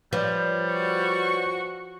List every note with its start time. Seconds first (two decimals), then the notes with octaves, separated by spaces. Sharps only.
0.13 F3 G3 B4 C#5 D5
0.73 F#4 C#6